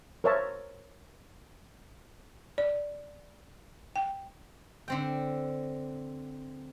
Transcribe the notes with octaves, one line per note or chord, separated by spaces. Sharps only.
A#4 C5 C#5 E5 A5
D5
G5
D3 C4 G5